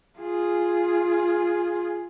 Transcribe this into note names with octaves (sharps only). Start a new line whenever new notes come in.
F4 G#4